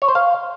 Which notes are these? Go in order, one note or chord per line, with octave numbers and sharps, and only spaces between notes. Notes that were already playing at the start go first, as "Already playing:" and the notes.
C#5
C5
F5